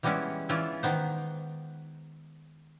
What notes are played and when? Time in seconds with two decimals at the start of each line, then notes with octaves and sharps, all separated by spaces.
0.03 E3 G3 G#3 B3 C#4 E4
0.49 E3 C#4 F4 D5 E5 G#5
0.83 D#3 B3 C5